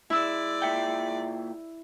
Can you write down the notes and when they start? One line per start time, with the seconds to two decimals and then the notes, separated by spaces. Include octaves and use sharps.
0.10 G#3 E4 D5 E6
0.62 A#2 E5 G5